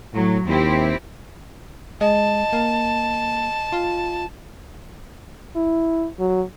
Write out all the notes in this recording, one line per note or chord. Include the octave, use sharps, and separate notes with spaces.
A2 F#3
D#2 C4 E4 G4
G#3 D#5 A5
A#3
F4
E4
F#3